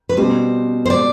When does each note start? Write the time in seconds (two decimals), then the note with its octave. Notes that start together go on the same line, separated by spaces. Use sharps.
0.09 B4
0.17 B2 G3 C4 C5
0.86 C5
0.90 D5